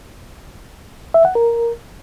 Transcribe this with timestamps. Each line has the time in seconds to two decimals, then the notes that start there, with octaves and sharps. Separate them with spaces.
1.14 E5
1.25 F#5
1.35 A#4